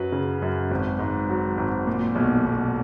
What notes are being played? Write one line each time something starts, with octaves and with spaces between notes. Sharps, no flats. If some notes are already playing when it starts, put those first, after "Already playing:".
Already playing: F#2 F#3 B4
C#3
F#2
G#1
G#2
F#3
G#1
A#2
B1
B1